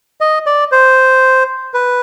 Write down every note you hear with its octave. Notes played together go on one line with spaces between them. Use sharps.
D#5
D5
C5
B4